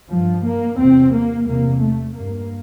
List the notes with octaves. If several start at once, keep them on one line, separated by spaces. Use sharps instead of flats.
G2 F3
A#3
E2 C3 C4
A#3
E2 C3 A#3
A3
G2 A#3